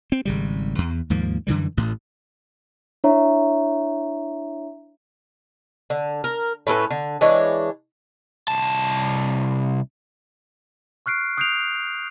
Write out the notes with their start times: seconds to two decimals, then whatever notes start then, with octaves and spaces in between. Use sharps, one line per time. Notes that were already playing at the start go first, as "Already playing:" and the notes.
0.12 C4
0.25 G#1 C#3 G3
0.78 E2
1.10 D#2 G#2 F3 A#3
1.47 F#2 D3 E3 G3
1.77 A1 A2
3.04 D4 E4 C#5 E5 A#5
5.90 D3
6.24 A#4
6.67 A2 C#4 A4 B4
6.91 D3
7.21 E3 G#3 D4 C#5
8.48 C2 A5
11.06 C#6 F6 F#6 C7 D7
11.37 D#6 F#6 G6 C7 D7 F7